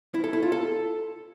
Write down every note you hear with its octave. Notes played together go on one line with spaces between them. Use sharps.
E4
A4
E4
F4
A4